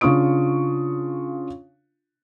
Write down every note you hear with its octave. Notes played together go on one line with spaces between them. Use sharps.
C#3 D4 F4 C#6 D#6 D7